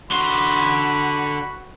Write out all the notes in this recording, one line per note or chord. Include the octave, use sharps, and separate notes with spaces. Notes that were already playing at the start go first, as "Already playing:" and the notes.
D3 F#4 B5 C6